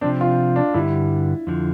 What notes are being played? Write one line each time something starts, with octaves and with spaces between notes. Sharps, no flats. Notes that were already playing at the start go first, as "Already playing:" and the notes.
C3 F3 C4 D4
F4
D4
G2 D3 G3 E4
F2 D3 F3